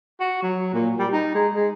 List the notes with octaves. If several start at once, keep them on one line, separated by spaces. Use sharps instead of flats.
F#4
F#3
A#2
G3
D#4
G#3
G#3